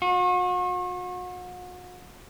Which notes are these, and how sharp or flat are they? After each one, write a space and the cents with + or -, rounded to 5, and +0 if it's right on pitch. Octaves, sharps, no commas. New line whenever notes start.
F#4 -40